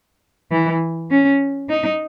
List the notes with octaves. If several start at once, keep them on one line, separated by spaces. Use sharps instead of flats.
E3
C#4
D#4